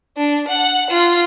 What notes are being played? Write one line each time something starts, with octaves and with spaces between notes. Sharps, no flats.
D4
F#5
F4